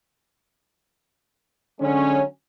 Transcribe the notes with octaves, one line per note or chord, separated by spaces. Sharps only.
D3 F#3 G#3 C#4